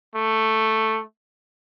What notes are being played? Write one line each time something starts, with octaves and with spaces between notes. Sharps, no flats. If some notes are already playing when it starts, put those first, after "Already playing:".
A3